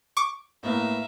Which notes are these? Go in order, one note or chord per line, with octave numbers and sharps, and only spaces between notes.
C#6 D6
A2 A#3 B3 E5 F5 A#5